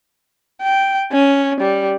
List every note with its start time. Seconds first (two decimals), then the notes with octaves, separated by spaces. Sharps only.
0.62 G5
1.12 C#4
1.60 G3